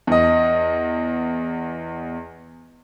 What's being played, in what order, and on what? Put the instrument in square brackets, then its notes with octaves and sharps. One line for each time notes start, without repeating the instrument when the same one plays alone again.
[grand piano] E2 D#5